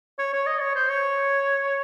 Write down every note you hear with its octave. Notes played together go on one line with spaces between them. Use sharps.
C#5
C#5
D#5
C#5
C5
C#5